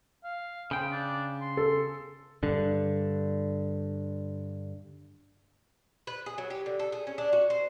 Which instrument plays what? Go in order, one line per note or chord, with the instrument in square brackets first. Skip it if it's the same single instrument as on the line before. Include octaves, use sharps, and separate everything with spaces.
[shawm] F5
[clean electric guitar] C#3 G5 [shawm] C5
[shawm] D4
C6
[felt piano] A4
[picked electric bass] G2 D3
[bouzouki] B4
G#4
F#3
G4
D3
A4
G#4
C#4
D4
F#4
C5